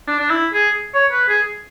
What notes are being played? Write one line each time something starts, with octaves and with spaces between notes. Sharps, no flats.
D4
D4
E4
G#4
C#5
B4
G#4